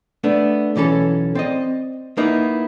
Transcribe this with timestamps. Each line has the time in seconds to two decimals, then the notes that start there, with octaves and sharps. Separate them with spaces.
0.24 A3 B3 D4
0.76 B1 E3 C#4 A4
1.35 C4 D5 D#5
2.17 A#3 B3 D#4 E4